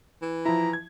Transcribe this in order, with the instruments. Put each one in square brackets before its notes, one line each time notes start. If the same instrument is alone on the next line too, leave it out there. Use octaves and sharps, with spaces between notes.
[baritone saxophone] E3
[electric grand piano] F3 E4 [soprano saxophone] A#5
[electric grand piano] G#6